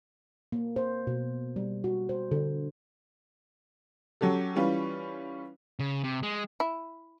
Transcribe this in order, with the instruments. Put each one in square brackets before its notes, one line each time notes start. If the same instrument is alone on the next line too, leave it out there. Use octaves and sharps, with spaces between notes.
[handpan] A#3
C5
B2
G3
F#4
C5
D3
[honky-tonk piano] F#3 C#4 G4 A4
E3 G3 C#4 F4 B4
[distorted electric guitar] C#3
C3
G#3
[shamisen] E4